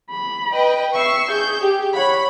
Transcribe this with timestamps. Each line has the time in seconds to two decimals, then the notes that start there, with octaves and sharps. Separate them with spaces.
0.11 B5
0.53 B4 D#5 G5
0.96 E5 C#6 C7
1.31 G#4 G6
1.61 G4
1.95 C#5 F#5 B5